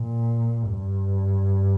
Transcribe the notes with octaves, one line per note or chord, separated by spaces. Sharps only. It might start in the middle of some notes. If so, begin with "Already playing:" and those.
Already playing: A#2
G2